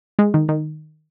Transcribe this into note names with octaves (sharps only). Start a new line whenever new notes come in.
G#3
D#3
D#3